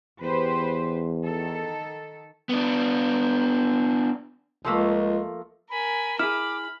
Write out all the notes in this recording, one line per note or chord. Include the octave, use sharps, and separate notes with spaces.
E2 G4 B4 C5
D#3 A4
B3 D4
C#2 F3 A3 A#3
A#4 G#5 B5
E4 G#4 B5 D6 F6